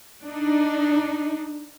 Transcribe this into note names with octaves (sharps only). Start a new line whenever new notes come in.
D4 D#4